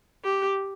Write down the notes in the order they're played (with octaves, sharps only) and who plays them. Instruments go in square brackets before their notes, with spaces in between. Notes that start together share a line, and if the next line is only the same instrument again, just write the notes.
[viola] G4